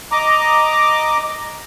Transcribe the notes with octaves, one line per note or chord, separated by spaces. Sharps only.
D#5 A#5 D6